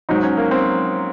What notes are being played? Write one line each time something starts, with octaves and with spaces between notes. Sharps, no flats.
G#2 F#3 D#4
C#4
A#3
C4